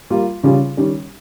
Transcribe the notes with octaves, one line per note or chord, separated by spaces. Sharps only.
G3 A#3 F4
C#3 G3 C#4 F4 G#4
D#3 G3 C#4